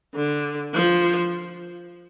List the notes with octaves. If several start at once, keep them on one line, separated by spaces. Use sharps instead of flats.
D3
F3